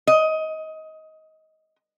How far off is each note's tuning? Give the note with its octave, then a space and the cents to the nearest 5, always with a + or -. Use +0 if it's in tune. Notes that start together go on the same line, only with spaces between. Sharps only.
D#5 +20